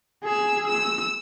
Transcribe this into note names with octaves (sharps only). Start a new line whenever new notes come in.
G#4 E6
E6